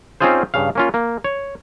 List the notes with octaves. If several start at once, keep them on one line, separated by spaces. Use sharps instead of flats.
C4 C#4 D#4 F4 G#4 C5
G2 C#3 F5
A#3 C#4 F4
A#3
C#5